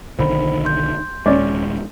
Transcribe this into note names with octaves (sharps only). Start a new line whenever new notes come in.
B1 D3 D#3 C5 B5
C6 G6
D#1 G#3 C#4 D5